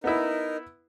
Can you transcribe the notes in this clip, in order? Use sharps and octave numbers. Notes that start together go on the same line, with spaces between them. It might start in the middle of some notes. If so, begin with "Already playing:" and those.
B3 D#4 E4 A#4